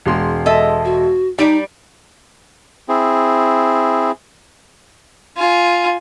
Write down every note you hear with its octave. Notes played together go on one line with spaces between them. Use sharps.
E1 G#3 C6
A4 D#5 E5
F#4
G3 D#4 D5 D7
C4 E4 G#4
F4 G#5